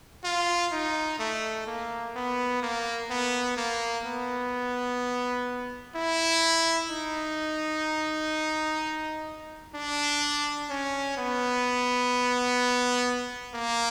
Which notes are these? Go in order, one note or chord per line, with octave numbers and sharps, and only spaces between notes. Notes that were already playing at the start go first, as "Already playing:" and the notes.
F4
D#4
A3
A#3
B3
A#3
B3
A#3
B3
E4
D#4
D4
C#4
B3
A#3